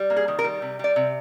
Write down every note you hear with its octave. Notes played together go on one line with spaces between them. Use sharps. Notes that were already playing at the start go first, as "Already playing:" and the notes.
Already playing: G3
A#3
G#4
D#3
A#4
G3
C3
G3 D5
C3